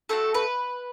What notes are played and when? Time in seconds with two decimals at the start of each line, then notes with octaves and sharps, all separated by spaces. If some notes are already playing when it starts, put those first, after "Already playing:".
0.09 A3 C4 F#4 A4
0.34 B4